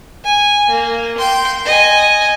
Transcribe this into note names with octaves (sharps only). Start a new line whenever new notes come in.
G#5
A#3
G5 C6
D#5 G#5